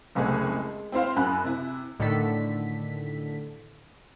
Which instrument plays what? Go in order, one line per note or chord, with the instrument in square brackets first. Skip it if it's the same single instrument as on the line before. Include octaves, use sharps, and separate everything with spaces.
[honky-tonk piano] F#1 C2 A3 G#4
G#3
C4 E4 C5 F5
F#2 B5 F#6
C3 E4
[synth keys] A2 D3 D#3 A4 B6